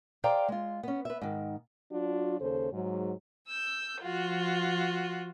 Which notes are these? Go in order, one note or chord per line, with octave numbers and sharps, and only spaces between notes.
G#4 C5 D5 F5 G5 A#5
G#3 F4
B3 C#4
B4 E5
G#2 D#3
F#3 D4 F4 F#4
D#2 C#3 A4 C5
G#2 F#3
E6 G6
F3 F4 F#4